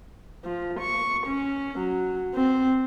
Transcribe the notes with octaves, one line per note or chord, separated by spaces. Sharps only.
F3
C#6
C#4
F#3
C4